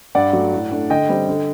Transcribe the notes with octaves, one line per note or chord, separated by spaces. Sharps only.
G2 D5 F#5
F#3 A3
A2
A3 D4
D3 D#5 G5
G3 C4
D3